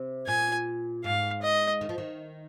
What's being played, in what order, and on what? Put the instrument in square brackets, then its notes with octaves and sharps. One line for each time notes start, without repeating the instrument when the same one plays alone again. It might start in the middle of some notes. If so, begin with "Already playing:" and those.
Already playing: [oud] C3
[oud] A#2 [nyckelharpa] G#5
[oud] G#2 [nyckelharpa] F5
[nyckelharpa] D#5
[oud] D#3
F3
D#3